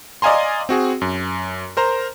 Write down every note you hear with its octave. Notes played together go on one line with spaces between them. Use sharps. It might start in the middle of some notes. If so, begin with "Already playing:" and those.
D5 D#5 F5 G#5 A#5 C6
C4 F#4 G#4
F#2
A#4 C5 A#5